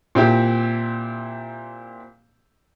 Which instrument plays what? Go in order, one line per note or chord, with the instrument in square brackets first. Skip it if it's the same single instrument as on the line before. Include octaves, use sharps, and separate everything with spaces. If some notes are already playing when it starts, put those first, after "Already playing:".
[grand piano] A#2 C4 E4 G4